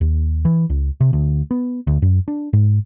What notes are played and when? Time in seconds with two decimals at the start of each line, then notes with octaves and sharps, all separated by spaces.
0.01 D#2
0.45 E3
0.70 C#2
1.01 C3
1.13 D2
1.51 B3
1.87 D2
2.02 F#2
2.28 D4
2.53 G#2